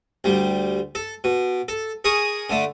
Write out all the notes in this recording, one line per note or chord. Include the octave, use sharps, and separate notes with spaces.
D2 G3
A4
B2
A4
G#4 A#4 C#6 D#6
D3 A3